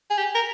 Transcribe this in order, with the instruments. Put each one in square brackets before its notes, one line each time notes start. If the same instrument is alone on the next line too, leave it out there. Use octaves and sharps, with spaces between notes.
[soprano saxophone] G#4
G4
A#4